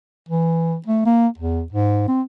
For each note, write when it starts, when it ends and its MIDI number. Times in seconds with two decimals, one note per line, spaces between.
0.29 0.76 52
0.86 1.01 57
1.06 1.28 58
1.38 1.63 40
1.72 2.07 44
2.08 2.22 60